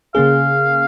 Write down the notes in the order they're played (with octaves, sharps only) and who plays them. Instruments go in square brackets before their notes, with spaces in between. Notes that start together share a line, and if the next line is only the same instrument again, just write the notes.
[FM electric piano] C#3 A#3 C#4 G#4 [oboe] F5